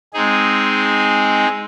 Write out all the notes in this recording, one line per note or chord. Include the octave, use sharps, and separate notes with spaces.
G#3 C4 D#4 G#4